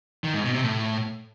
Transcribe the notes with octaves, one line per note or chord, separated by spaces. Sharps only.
D#3
G#2
B2
C3
A2